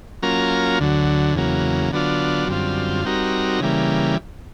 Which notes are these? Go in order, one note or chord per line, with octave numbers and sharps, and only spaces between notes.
F#3 A#3 C#4 F4 A#4
D2 D3 F#3
E2 C#3 F#3 A#3
D3 F#3 B3 D4 F4
F#2 D3 G3 C4 F4
G3 C4 D#4 F#4 A#4
C#3 E3 G3 A#3